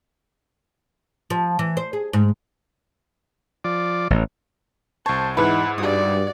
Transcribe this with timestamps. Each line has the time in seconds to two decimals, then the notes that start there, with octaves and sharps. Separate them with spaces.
1.30 F3
1.59 E3
1.77 C5
1.93 G#4
2.13 G#2
3.64 F3 D5
4.10 A1
5.06 C2 C5 C#5 A5
5.37 E2 G#2 D#4 E4 B4 F#5
5.78 G2 F#4 D5 D#6